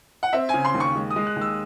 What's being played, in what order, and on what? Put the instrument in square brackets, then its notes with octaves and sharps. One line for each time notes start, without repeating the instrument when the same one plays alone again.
[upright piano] F#5
C4 E5
C#3 G#5
C6
D#2
C#6
G#3
D#6
G#3
F#6
D#2
E6